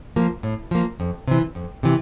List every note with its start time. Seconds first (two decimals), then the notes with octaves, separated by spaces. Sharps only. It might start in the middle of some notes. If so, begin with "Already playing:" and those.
0.16 F3 A#3
0.43 A2
0.71 F3 A#3
1.00 F2
1.27 C3 E3
1.55 F2
1.83 C3 E3